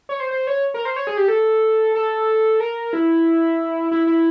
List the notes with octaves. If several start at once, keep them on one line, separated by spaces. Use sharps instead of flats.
C#5
C5
C5
C#5
A#4
C5
C#5
G#4
G4
A4
A4
A#4
E4
E4
E4